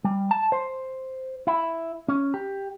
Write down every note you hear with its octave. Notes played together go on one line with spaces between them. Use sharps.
G3
A5
C5
E4
C#4
G4